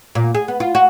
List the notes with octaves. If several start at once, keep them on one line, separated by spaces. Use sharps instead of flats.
A#2
G#4
B3
F4
F#4